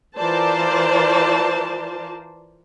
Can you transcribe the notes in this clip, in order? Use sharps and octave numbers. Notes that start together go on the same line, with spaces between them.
E3 F4 A#4 C5 D5 A5